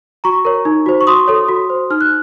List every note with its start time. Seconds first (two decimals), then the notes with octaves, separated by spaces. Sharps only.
0.24 F#4 A#5 C#6
0.45 A#4 C#5
0.65 D#4
0.86 F#4 C5
1.01 C#6
1.07 F#4 C6 D#6
1.27 A4 C#5
1.48 F#4
1.70 C5
1.90 D#4 F6
2.01 F#6